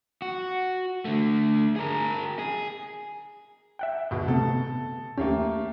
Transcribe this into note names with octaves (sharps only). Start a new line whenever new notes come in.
F#4
D3 A3
G#4 A#4
G#4
E5 F#5 G5
D2 B2
C3 A3 B3 A4
D#2 A3 A#3 C#4 G4